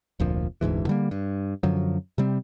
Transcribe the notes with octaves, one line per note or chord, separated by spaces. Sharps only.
F1 D2 A#2 F3
F1 D2 G#2 E3
D3 G3 A#3
G2
F#2 D3 F3 F#3
C3 G3 C4